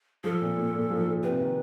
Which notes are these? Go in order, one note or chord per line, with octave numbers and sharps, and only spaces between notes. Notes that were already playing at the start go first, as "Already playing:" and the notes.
F3 A4
A#2
A#2
A#2
F3
A#2
C3 B4
D#3